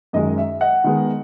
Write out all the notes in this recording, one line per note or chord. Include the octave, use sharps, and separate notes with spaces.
F#2 D#3 G#3 D#5
E5
D#5 F#5
D#3 G#3 B3